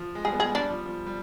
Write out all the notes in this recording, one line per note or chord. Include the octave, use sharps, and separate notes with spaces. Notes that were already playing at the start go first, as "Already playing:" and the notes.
Already playing: F3
G#3
G3 G#4
B3
G#3 G#4
G3 D4
F3
F3
G3